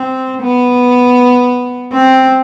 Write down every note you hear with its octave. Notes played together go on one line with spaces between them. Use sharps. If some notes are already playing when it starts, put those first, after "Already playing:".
Already playing: C4
B3
C4